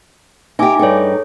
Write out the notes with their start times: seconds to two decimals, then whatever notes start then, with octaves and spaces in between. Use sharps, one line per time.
0.59 D#4 G4 E5 G#5 D6
0.79 G2 D#4 G#4 A4 C#5